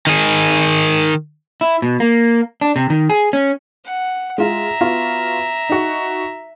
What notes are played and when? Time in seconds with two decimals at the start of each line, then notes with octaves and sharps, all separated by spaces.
0.07 D#3 G#4
1.61 E4
1.82 B2
2.00 A#3
2.61 D4
2.76 C3
2.90 D#3
3.10 G#4
3.33 C#4
3.85 F#5
4.38 G#3 F4 E5 A#5
4.81 B3 F4 F#4
5.69 D#4 F#4